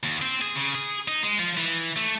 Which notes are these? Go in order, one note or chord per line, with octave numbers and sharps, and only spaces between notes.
D#2
C4
G#4
C#3
G#4
D#4
G#3
F3
E3
A3